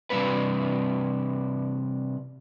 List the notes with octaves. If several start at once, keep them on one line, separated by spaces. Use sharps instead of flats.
C3 E3 G3 C#4 D4 B4